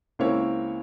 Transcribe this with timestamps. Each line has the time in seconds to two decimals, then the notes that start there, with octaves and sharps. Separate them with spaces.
0.19 C#2 A#3 C4 E4 C#5